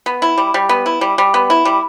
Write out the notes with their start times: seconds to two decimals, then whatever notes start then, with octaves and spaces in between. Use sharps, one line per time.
0.06 B3
0.22 E4
0.38 G3
0.54 G3
0.69 B3
0.86 E4
1.01 G3
1.18 G3
1.34 B3
1.50 E4
1.65 G3